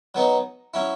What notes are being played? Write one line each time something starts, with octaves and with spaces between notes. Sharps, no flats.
F#3 B3 D#4
F#3 C#4 E4